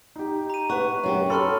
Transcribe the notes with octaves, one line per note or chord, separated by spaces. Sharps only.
D#4 G4
A#5 D#7
B4 F#5 C#6
F#2 F#4 G4
A4 B5 C6 F6